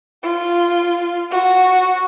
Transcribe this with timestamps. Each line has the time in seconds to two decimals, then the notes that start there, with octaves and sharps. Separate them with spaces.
0.23 F4
1.31 F#4